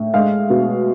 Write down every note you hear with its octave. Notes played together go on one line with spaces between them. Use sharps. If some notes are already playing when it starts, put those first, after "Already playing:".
Already playing: A2
G#3 F5
B2